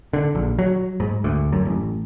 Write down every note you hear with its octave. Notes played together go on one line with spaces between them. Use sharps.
D3
A#1
F#3
G#2
D2
F#2
A1